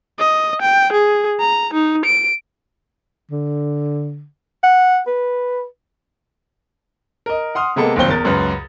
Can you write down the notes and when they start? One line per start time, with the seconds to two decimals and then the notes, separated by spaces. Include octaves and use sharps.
0.20 D#5
0.62 G5
0.93 G#4
1.40 A#5
1.74 D#4
2.05 D7
3.31 D3
4.63 F#5
5.07 B4
7.26 A#4 D#5
7.55 F#5 C6 D#6 F6
7.76 C3 G#3 A#3 B3 A4
7.96 F#1 D#2 A#2 C4 G7
8.08 E2 A#4 A6
8.25 C#2 F#2 B4